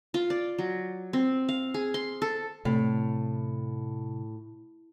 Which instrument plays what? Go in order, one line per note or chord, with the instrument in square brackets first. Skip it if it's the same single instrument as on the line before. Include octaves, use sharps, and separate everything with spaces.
[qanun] F4
D5
F#3
C4
F5
G#4
C6
A4
[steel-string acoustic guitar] A2 [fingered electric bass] C3